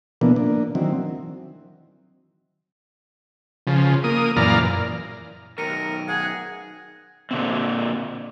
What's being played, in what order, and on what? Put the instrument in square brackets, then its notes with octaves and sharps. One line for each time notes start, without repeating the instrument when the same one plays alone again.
[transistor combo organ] B2 E3 F3 A#3 B3 D4
A#3 D4
D#3 E3 F#3 C4
C#3 F3
A#3 D#6
F#2 A#2 E3 D5 F5 A#5
[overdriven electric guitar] B1 D#3 [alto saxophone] A#4 [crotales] A#6 C#7 D#7
[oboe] G#4 [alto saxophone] F#5
[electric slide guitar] A#2 D3 C4